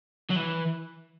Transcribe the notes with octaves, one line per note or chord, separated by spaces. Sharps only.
F#3
E3